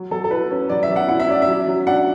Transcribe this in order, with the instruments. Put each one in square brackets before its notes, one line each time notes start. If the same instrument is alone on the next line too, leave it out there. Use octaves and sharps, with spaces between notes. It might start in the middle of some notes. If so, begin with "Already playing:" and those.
Already playing: [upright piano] F#3
F#3 A4
A4
E4 B4
C#4
F#3 D5
E5
F#3
F#5
E4 F#5
E5
C#4 D5
E5
F#3
F#3
D4 F#5